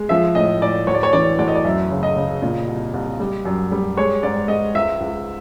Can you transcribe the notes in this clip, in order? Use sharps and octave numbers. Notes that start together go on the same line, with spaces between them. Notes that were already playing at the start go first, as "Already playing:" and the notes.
Already playing: G#3
F3 E5
A2 D#5
A2 D5
D2 C#5
D5
C#5
E3 D5
D2 D5
D#5
D5
F#2 E5
C#3
D#5
C#3
A#2
C2
C2
G3
F#2
G3
G#3 C#5
G#2 D5
G#2 D#5
C#2 E5
C#2